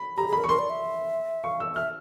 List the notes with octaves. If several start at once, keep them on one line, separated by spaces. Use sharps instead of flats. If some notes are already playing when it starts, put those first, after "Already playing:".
Already playing: B5
G4 A#5
G#4 B5
A#4
C#6
A#4 C6
D5
E5
F5 C#6
E6
E5 F6